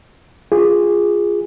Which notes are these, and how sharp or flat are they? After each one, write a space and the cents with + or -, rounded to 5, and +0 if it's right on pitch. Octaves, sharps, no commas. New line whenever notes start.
F4 +0 G#4 -10